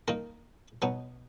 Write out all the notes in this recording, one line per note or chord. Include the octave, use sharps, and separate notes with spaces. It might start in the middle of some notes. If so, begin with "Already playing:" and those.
D#3 A#3 D#4 A#4
B2 F#3 B3 D#4